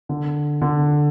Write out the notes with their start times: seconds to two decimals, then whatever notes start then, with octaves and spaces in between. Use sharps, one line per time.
0.09 D3
0.62 D3